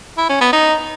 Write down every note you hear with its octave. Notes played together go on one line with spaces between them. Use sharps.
E4
C#4
B3
D#4